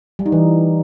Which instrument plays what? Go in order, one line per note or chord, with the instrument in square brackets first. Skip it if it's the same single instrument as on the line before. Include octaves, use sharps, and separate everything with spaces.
[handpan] G3
D#4
E3